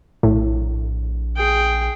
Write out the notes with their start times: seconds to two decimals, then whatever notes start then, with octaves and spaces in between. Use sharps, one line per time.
0.23 A#1 A2
1.36 G#4 G5